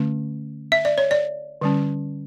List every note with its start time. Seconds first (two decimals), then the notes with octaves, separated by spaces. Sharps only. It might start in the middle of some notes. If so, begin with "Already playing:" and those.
Already playing: D3 A3 C#4
0.72 E5
0.85 D5
0.98 C#5
1.11 D5
1.61 D3 G3 C#4